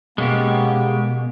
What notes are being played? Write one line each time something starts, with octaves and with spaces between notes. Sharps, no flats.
B2 G#3 A#3 B3 C#4 G4